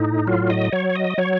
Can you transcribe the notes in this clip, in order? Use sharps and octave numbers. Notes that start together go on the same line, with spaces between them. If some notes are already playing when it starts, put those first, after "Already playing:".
Already playing: A2 D#4
F#3 F4
D#5
F#3 C#5
D#5
F#3 C#5